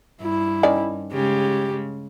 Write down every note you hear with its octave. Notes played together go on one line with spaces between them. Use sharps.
G2 E4
D#3 C#4 D5
C#3 G#3 G4